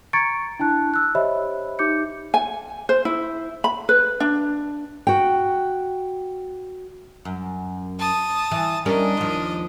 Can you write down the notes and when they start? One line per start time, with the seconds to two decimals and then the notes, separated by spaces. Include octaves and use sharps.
0.13 A#5 C#6 G#6 A6 C#7 D7
0.60 D4 E4 A5 F#6
0.94 E6 F#6
1.15 G4 C5 C#5 D#5 E5 B5
1.79 D#4 G4 D6 G6 C#7
2.34 G#5
2.89 C5
3.05 E4
3.64 B5
3.89 B4
4.20 D4
5.07 F#4 G5
7.25 F#2
8.00 A5 D#6
8.51 E3
8.86 G3 C#4 D4 A#4 D#5
9.17 D#2 F3